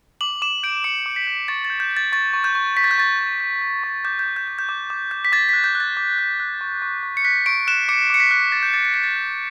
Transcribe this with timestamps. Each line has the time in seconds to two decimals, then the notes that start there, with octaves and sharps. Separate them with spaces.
0.21 D6 F#7
0.42 D6 E7
0.63 G6 D7
0.84 D6 C#7
1.06 D6
1.16 B6
1.27 G6
1.48 C#6 A6
1.65 A6
1.70 G6
1.80 G6
1.91 G6
1.97 A6
2.12 C#6 A6
2.34 C#6
2.44 G6
2.55 C#6
2.76 C#6 B6
2.84 A6
2.91 G6
2.98 C#6 A6
3.19 G6
3.40 G6
3.62 G6
3.84 C#6
4.04 D6 G6
4.19 G6
4.26 D6
4.36 G6
4.47 G6
4.59 G6
4.69 D6
4.90 D6
5.11 G6
5.25 B6
5.32 D6 A6
5.49 F#6 B6
5.64 G6
5.75 F#6
5.80 A6
5.97 D6
6.18 F#6
6.40 F#6
6.61 C#6
6.82 C#6
7.03 C#6
7.17 C#7
7.24 F#6 B6
7.46 C#6 D7
7.67 F#6 E7
7.89 D6 C#7
8.10 D6 C#7
8.20 B6
8.31 F#6
8.52 F#6 A6
8.63 G6
8.73 D6 A6
8.85 A6
8.94 D6 B6
9.04 A6
9.16 F#6